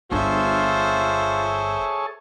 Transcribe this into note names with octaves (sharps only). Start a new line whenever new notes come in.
G1 D4 F4 G#4 A4 C5 C#5 E5